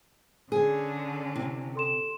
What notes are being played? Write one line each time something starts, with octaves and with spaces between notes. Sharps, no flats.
D3 C#4 G#4
C3 E4
A4 C6 E7